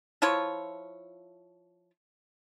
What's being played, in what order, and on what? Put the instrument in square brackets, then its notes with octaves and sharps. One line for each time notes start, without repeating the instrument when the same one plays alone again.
[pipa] F3 E4 F4 C#5